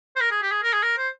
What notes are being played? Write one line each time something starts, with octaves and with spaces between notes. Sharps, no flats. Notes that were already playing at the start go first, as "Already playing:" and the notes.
C5
A#4
G#4
G4
G#4
A#4
G#4
A#4
C5